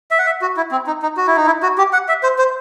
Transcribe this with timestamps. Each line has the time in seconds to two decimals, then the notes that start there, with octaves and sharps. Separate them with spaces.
0.11 E5
0.19 F#5
0.26 E5
0.42 F#4
0.57 E4
0.72 C4
0.87 D#4
1.02 D#4
1.17 F#4
1.27 E4
1.37 D#4
1.46 E4
1.63 F#4
1.78 G4
1.93 F#5
2.08 E5
2.23 C5
2.39 C5